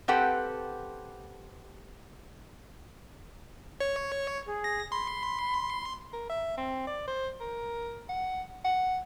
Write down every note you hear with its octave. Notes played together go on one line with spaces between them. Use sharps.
C4 G4 A4 B4 F#5 G5
C#5
G#4
A#6
B5 C6
A#4
E5
C4
D5
C5
A#4
F#5
F#5